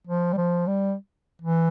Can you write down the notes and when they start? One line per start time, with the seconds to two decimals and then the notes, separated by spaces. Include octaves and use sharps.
0.07 F3
0.33 G3
0.37 F3
0.67 G3
1.41 E3